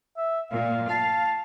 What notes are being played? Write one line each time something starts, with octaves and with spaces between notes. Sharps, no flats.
E5
A#2 F5
F5 A5